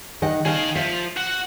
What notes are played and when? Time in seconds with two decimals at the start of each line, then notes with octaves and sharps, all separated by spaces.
0.22 D#3 D#5 F#5
0.45 D#3 G#4 F5 A5
0.75 F3 E5
1.17 F#4